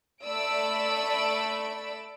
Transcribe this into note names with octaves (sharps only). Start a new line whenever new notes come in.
A3 D5 B5 E6 D7